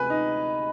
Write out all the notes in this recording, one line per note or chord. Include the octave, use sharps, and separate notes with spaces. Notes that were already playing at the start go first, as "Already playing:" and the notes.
Already playing: D2 C3 F3 G#3 B4 G#5 B5
D#4